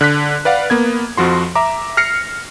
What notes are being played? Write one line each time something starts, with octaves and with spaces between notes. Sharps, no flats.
D3 F#6 B6
B4 D5 F5 F#5
A#3 B3 G#6
F2 F3 F#4 C6
E5 A#5 D6
F6 A#6 C7 C#7